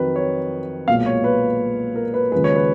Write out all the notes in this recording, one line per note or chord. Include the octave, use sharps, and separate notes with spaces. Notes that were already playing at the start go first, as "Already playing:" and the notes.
Already playing: F2 D#3 F#3 B4
C#5
B1 A#2 G#3 F5
C#5
B4
A#4
B4
D#2 C#3 F3 G#3 B4
C#5
B4